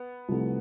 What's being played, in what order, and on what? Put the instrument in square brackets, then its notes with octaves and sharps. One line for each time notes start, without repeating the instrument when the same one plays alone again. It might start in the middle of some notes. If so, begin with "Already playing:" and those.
Already playing: [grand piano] B3
[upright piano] C2 C3 F3 A3